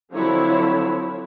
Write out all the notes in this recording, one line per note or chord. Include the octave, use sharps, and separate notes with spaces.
D3 F3 F#3 C4 E4 C#5